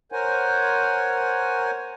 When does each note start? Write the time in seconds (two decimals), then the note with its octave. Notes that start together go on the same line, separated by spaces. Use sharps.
0.12 A#4 C5 C#5 F#5 G#5